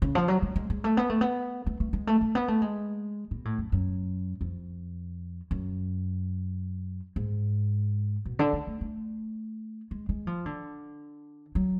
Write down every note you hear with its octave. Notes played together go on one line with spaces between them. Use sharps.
C#3
F3
F#3
G#3
G#3
G#3
A3
B3
A3
B3
A3
A3
G#3
A3
A3
B3
A3
G#3
B2
A2
F#2
F#2
F2
F#2
G#2
B2
D3
A3
A3
A3
G#3
G#3
F3
D3
F#3